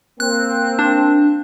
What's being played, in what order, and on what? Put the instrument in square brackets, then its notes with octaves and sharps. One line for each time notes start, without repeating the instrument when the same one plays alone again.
[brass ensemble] A#3 C4 [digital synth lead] F#6
[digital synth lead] D4